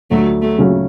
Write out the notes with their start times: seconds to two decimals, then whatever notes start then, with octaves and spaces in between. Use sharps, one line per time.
0.10 D2 F#3 A3
0.42 F#3 A3
0.58 C#3 F#3 C#4 F#4